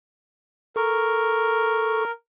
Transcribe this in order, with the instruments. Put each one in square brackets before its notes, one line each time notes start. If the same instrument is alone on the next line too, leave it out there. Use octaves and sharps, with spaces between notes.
[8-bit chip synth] A4 C#6 [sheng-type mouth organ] A#4